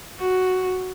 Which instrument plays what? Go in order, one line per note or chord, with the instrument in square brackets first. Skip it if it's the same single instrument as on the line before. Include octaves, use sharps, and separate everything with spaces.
[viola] F#4